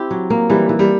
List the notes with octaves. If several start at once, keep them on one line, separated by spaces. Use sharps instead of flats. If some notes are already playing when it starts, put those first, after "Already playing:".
Already playing: C4 E4 G4
F#3
A#3
E3 G3
E3
G3